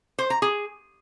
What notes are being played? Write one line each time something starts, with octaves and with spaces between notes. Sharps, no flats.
C5
A#5
G#4